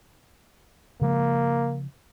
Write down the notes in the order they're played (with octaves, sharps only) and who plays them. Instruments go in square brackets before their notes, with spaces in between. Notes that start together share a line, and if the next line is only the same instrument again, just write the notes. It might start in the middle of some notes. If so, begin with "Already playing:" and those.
[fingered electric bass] C#3 F3 G#3 [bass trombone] A#3